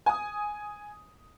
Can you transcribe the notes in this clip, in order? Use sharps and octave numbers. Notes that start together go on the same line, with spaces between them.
G#5 D#6